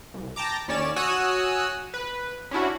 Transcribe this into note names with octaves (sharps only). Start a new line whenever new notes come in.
C2
G5 A5 A#5 D6
D#2 C#4 C#5 D5 E7
F#4 C#5 G#5 D#6 E6 F#6
B4
C#4 D4 E4 F#4